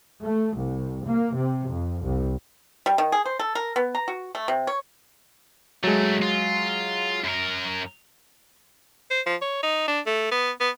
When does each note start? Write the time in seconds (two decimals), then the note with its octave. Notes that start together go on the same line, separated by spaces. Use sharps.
0.22 A3
0.57 C2
1.06 A#3
1.37 C3
1.72 F2
2.02 C2
2.86 G3
2.98 D#3
3.12 G#4
3.26 C5
3.39 A4
3.55 A#4
3.76 B3
3.95 A#5
4.08 F#4
4.35 A3
4.48 C3
4.67 C#5
5.84 D#2 F#3 G#3 A3
6.22 F4
7.24 F#2 A#4
9.11 C5
9.26 F3
9.42 C#5
9.63 D#4
9.87 D4
10.06 A3
10.31 B3
10.60 B3